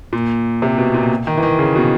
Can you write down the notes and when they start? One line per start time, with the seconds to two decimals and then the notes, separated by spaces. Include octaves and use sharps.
0.13 A#2
0.62 C3
0.78 B2
0.94 A#2
1.27 D#3
1.37 E3
1.43 D#3
1.59 C#3
1.76 B2